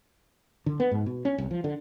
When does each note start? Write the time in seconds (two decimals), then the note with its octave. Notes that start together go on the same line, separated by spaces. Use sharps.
0.66 D3
0.80 B3
0.91 G#2
1.06 B2
1.25 C#4
1.38 C2
1.51 F3
1.64 D3